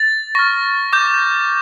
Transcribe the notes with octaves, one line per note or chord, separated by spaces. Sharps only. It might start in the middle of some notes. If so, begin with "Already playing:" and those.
Already playing: A6
C#6 F6 A#6
D6 G6